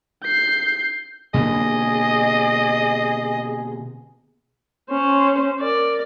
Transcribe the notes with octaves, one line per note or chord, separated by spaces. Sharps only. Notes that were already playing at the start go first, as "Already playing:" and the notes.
G6 C7
B2 D3 A#3 G#4 D#5
C#4 C5
A#4 D5